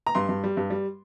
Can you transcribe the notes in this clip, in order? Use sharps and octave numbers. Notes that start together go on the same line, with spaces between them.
A#5
G2 C6
G2
G3
G2
G3